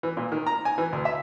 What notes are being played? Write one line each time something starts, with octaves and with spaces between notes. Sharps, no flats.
E3
A#2
D#3
A#5
G#5
E3
D2
E5